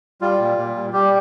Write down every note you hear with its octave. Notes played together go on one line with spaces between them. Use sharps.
G3 F4
A#2
A#2
G3
G3 G4